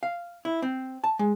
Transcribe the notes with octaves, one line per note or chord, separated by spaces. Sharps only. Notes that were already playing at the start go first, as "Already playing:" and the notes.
F5
E4
C4
A5
G#3